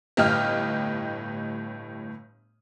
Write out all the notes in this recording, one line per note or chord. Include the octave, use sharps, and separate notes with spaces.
G1 A2 G4 D#5 F6